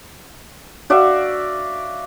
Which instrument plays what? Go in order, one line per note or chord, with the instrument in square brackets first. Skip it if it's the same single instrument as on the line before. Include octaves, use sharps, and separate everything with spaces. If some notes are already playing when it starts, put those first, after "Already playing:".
[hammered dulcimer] F#4 D5 E5 F5